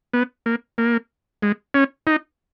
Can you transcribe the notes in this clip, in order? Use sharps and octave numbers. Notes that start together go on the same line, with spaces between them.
B3
A#3
A#3
G#3
C#4
D#4